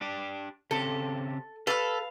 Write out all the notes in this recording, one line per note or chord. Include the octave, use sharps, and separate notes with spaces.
D4 G4 D5
C#3 C4 G4 A4
A4 B4 F5 F6